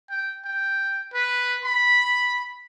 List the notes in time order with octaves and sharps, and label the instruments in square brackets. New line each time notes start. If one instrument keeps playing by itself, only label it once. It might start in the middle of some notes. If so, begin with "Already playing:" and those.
[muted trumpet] G5
G5
B4
B5